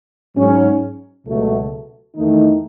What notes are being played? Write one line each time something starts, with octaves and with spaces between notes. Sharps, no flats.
G#2 F#3 C#4
C#2 B2 F#3 A3
E2 D#3 A3 D#4